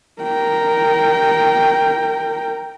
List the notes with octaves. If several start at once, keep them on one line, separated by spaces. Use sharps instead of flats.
A#4 G5